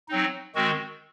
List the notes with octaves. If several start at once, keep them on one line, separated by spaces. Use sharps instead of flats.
F#3 C4 D#4
D#3 G#3 C4 F#4